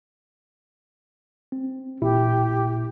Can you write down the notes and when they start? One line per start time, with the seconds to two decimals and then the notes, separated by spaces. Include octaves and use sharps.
1.52 C4
2.02 A1 A#2 E4 G4